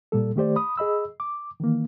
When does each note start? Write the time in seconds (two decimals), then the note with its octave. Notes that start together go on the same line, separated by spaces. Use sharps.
0.12 A#2 G3 A4
0.36 D#3 A3 G4 C5 D5
0.56 B5 D#6
0.77 G#4 D#5 B5 E6
1.20 D6
1.60 D#3 E3 A#3